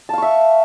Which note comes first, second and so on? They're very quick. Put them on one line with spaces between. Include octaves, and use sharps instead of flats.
A5 F5 C#6 E5